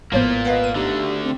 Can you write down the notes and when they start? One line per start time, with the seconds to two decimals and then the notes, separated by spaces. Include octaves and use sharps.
0.12 G#1 A2 F3 A#3 B3 F4 C5
0.45 B4 D#5 F5 F#5
0.64 D#7
0.75 D2 D3 D#4 G4
1.23 C4